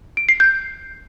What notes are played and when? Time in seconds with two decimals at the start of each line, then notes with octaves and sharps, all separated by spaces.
0.17 D7
0.29 C7
0.40 G6